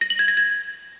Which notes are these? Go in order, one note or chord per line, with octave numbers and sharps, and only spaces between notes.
A#6
F#7
G#6
A#6
G#6